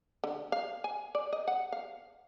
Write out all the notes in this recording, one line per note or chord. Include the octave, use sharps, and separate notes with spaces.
D3
F5
G#5
D5
D#5
F#5
F5